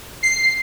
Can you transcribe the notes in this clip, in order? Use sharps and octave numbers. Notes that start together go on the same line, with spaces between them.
C7